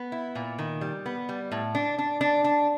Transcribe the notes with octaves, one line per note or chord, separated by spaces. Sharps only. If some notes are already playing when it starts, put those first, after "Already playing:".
Already playing: B3
E4
A#2
D#3
G3
B3
G3
A2
D4
D4
D4
D4